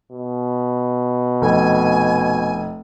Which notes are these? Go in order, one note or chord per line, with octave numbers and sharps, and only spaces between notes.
B2
F1 G#5